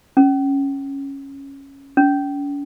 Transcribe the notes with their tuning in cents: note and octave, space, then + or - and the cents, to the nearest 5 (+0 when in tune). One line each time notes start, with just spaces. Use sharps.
C#4 -10
C#4 +45